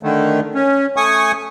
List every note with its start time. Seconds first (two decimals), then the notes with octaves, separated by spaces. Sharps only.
0.03 D3 D#3 A3
0.54 C#4
0.97 A3 G#5 C#6 D#6